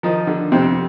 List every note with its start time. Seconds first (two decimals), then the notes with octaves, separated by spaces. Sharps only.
0.03 D#3 F3 D#4
0.27 D3
0.52 F2 C3 C4